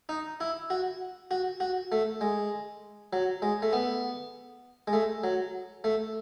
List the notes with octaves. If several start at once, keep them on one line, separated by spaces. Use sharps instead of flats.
D#4
E4
F#4
F#4
F#4
A3
G#3
F#3
G#3
A3
B3
G#3
A3
F#3
A3